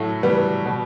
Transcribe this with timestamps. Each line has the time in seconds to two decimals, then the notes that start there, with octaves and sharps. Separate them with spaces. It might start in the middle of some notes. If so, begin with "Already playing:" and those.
Already playing: A2 F#3 A3
0.23 E3 G3 B3
0.66 B2